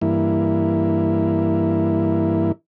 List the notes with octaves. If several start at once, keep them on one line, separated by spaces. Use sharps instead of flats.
G2 E3 A#3 E4